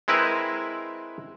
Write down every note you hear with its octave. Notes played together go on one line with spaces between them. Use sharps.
G#3 C4 E4 A#4 B4 E5